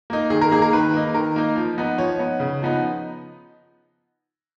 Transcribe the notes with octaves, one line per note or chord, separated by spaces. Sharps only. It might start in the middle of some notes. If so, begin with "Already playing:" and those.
A#3 D#4
D#3 G#4
A#4
A#3 D#4 G#4
A#4
D#3 B4
A#3 D#4
D#3 A#4
A#3 D#4
F3
B3 D#4
F3 C#5
B3 D#4
C#3
F3 B3 D#4